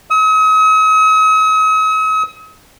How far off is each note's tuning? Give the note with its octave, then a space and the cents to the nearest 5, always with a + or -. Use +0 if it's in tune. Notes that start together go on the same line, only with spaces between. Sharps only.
D#6 +45